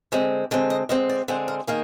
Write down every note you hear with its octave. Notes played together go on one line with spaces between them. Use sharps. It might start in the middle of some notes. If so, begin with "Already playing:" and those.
D3 G#3 C4 D#5
D3 G#3 C4
D#5
D3 G#3 C4 D#5
D5
D3 G#3 C4 C5
A#4
D#3 A#3 G#4